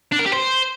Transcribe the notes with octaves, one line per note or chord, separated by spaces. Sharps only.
D4
A#4
G4
C5